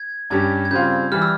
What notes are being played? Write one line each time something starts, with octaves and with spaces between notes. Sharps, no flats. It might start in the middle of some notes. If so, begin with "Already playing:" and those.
Already playing: G#6
G2 G3 C#4 G4 G#6
G#6
C#3 G3 C4 F4 G6
E3 G3 F6
E6